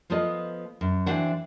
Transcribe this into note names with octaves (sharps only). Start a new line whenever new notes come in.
F3 B3 F4 A4 D#5
F#2
E3 C4 D4 F#4 F#5